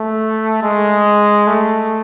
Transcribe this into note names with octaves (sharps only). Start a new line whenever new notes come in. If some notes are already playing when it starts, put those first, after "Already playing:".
Already playing: A3
G#3
A3